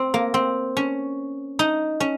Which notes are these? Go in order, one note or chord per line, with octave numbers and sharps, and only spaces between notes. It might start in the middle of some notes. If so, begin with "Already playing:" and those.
Already playing: C4
A#3
C4
C#4
D#4
C#4